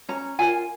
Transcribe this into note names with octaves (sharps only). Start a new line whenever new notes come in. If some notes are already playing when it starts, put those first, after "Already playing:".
C#4 A#5
F4 A#4 G#5